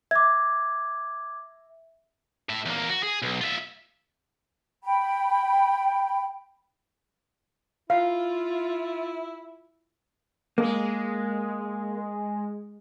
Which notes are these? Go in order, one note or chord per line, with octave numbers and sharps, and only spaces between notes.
E5 D6 G#6
A2 E5
E2 A#3
F#4
G#4
B1
F4 E5
G5 B5
E4 F4 F5
G#3 A#3